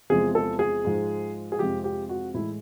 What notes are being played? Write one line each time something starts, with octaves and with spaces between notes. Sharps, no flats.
E2 C3 F3 G#3 G#4
A4
G#4
G#2 F3 G#3
G#4
F2 C3 F3 G#3 G4
G4
F#4
A2 E3 G#3 E4